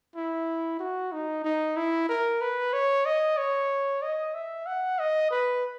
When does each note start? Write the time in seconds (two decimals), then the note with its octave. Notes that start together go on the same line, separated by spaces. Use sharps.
0.16 E4
0.80 F#4
1.12 D#4
1.44 D#4
1.77 E4
2.09 A#4
2.41 B4
2.73 C#5
3.06 D#5
3.37 C#5
4.02 D#5
4.34 E5
4.66 F#5
4.99 D#5
5.31 B4